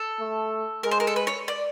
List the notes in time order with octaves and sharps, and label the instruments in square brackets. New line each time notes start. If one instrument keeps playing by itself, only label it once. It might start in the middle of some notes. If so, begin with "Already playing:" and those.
Already playing: [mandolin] A4
[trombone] A3
[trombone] G#3 [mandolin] A#4
[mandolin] C5
A#4
A4
B4
C#5
D5